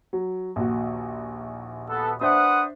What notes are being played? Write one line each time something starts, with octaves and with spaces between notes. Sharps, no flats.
F#3
A#1 D#2 F#4
B3 A4
D4 B4 C5 E5 F#5 D#6